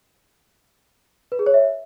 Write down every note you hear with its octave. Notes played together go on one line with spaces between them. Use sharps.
B4
G#4
C#5
E5